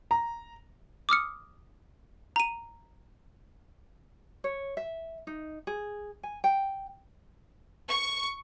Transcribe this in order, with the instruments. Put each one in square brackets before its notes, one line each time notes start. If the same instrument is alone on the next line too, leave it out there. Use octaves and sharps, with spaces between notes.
[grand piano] A#5
[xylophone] D6 D#6 F6 C#7
A#5 D#7
[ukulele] C#5
E5
D#4
G#4
G#5
G5
[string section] C#6